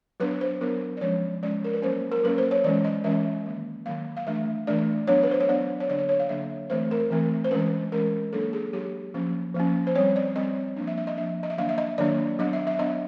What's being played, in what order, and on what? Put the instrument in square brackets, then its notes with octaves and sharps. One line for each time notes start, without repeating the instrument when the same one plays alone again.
[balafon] F#3 B3 D4 B4
C5
F#3 B3 D4 A#4
D5
F3 G#3 C#4 C#5
F3 G#3 C#4 D5
A#4
B4
F#3 A#3 C#4 C5
A#4
F#3 A#3 C#4 B4
C5
C#5
E3 G#3 C#4 D5
D#5
E3 G#3 C#4 E5
D#3 F#3 A#3
D#3 F#3 A#3 F5
F5
E3 A3 D4 E5
E3 A3 D4 D5
F#3 B3 D4 C#5
B4
C5
C#5
F#3 B3 D4 D5
C#5
D3 F#3 A#3 D4 D5
C#5
C#5
F5
D3 F#3 A#3 D4 E5
E3 A3 C4 C5
A#4
E3 A3 C4
C5
E3 G#3 C#4 B4
E3 G#3 C#4 A#4
F#3 A#3 D4 A4
G#4
F#3 A#3 D4 G4
F3 A#3 C#4
F3 A#3 C#4
C5
G3 C4 C#5
D5
G3 C4 D#5
F3 A#3 D4
E5
E5
D#5
F3 A#3 D4 E5
D#5
E5
D#3 F#3 A#3 D4 F5
E5
D#5
D#3 F#3 A#3 D4 D5
F#3 B3 D4 D#5
E5
E5
F#3 B3 D4 D#5